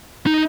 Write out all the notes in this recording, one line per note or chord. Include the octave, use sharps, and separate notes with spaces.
D#4